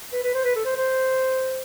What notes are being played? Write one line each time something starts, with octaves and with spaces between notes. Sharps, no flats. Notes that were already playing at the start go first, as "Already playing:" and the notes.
B4
B4
C5
B4
A4
C5
C5